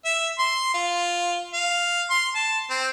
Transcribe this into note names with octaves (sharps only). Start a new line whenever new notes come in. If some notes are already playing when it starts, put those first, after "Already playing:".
E5
C6
F4
F5
C6
A5
C4